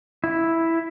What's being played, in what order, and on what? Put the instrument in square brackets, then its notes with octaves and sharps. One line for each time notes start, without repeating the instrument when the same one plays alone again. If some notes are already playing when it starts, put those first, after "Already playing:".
[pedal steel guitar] E4